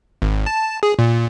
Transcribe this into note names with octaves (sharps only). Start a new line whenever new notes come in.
G#1
A5
G#4
A#2